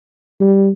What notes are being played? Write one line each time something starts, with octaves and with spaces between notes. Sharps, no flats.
G3